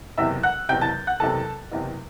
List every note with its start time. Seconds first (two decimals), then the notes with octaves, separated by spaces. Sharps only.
0.18 F#1 E2 C3 E5 E6
0.43 F#5 F#6
0.69 F#1 E2 C3 G5 G6
0.81 A5 A6
1.07 F#5 F#6
1.20 F#1 E2 C3 A4 A5
1.71 F#1 E2 C3